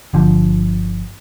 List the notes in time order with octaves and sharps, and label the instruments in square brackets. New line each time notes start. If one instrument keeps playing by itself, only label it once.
[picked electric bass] G1 D3 F3